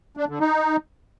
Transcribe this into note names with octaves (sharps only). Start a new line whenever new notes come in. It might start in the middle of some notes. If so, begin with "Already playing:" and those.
D4
D3
D#4